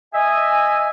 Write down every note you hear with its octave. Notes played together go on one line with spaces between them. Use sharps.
D#5 E5 G#5